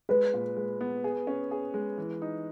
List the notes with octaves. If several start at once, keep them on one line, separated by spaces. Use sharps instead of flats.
G#3 B4
A#2
G#3
B3
G#4
C#4
G#4
G#3
E3
D#4